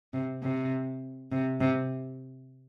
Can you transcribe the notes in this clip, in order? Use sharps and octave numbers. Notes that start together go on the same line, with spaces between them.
C3
C3
C3
C3